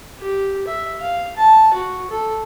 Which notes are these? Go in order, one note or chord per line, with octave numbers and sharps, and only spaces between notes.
G4
E5
F5
A5
F#4
A4